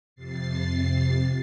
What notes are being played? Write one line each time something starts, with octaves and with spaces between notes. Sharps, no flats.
F2 C3 A6 C7